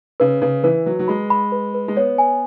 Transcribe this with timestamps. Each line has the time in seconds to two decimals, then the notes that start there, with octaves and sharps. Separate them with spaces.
0.20 C#3 B4
0.42 C#3 B4
0.64 E3 B4
0.86 F#3 B4
0.99 F#3
1.08 G#3 B5
1.30 B5
1.52 B4
1.74 B4
1.88 G#3
1.97 B3 C#5
2.18 G#5